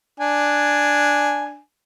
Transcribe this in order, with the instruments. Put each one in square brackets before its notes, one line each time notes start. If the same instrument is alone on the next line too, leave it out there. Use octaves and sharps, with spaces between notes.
[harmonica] D4 G#5